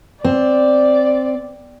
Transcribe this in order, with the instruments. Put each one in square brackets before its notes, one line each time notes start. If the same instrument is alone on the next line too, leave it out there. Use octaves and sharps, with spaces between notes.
[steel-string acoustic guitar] C4 [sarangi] D5